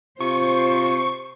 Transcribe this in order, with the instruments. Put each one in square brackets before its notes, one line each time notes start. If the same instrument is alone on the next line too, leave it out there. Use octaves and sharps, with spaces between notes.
[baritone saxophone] C3 [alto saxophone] F4 [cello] C5 [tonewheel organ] C#6